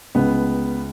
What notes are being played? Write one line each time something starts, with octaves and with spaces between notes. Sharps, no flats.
C#2 B3